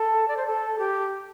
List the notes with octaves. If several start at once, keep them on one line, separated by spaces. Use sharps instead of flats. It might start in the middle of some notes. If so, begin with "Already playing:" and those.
Already playing: A4
D5
C5
A4
G4